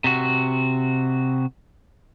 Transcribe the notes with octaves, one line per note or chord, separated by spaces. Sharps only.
C3 F#4